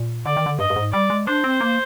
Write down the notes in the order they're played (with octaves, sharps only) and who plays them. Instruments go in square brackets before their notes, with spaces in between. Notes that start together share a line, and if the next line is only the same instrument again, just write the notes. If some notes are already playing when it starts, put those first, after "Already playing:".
Already playing: [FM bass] A#2
[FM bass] D3 [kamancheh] D5
[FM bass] D#3
D3
[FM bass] G2 [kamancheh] D#5
[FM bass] G2
G#2
[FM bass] G3 [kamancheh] D5
[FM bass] G#3
[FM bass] D4 [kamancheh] C5
[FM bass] C4
A#3